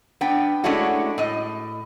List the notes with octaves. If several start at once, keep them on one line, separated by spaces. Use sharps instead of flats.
B3 D4 G5
G#3 A3 C#4 D4 E4 F#4
A2 D#5